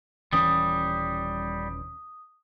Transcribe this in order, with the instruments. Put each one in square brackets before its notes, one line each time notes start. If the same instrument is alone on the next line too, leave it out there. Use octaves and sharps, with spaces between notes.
[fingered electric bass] D#1 E3 C#4 [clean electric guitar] G3 [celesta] D#6